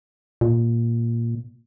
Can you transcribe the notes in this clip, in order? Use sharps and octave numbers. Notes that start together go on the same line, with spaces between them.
A#2